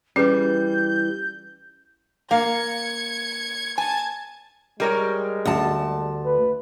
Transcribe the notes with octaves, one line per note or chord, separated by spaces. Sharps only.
E3 G3 C#4 G#4 B4 G6
A#3 F5 G#6 C#7
G#5 A5 G#6
G3 G#3 A#4 C#5
D2 A5
B4